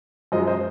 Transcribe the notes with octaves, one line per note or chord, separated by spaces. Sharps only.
F#2 F3 G#3 C5 D#5
C5 D#5